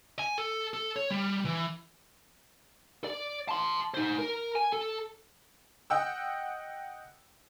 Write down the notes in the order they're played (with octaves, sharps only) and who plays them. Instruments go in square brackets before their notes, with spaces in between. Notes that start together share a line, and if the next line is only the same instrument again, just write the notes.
[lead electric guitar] G#5
A4
A4
C#5
G3
E3
D5
A5 C6
D#4 C5
A#4
G#5
A4
[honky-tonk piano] D#5 F#5 G5 E6